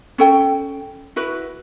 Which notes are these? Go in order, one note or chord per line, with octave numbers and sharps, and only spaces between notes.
C#4 A4 G5
E4 F#4 B4